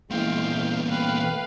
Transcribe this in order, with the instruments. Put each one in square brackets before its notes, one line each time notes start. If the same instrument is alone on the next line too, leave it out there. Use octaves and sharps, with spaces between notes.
[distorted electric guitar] E2 A#2 [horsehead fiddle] G#3 E4 [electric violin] F5 G5
[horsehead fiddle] A3 G5 [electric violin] B4 F5